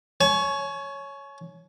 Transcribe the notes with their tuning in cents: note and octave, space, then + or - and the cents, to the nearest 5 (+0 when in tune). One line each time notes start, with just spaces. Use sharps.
C#5 +0 G#5 +40